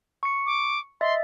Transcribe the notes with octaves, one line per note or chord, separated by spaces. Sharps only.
C#6 C#7
D6
D#5 E5 C6 A6